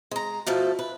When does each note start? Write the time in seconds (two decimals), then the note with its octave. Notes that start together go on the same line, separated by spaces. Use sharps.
0.11 G#3 A#5
0.47 B2 F3 A3 A4
0.79 B4